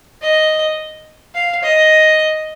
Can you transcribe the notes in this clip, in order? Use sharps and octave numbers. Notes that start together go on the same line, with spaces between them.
D#5
F5
D#5